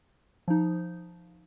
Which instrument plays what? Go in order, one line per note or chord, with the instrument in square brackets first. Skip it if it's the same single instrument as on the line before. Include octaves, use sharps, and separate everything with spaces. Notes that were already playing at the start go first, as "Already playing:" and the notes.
[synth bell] F3 D#4